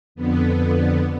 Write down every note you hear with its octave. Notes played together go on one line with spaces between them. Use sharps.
F2 D3 B3